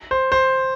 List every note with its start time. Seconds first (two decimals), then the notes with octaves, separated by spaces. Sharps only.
0.11 C5
0.32 C5